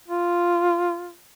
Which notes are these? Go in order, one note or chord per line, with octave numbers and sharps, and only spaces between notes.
F4